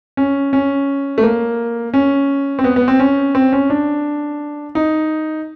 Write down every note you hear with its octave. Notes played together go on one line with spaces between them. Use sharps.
C#4
C#4
A3
A#3
C#4
C4
B3
B3
C4
C#4
C4
C#4
D4
D#4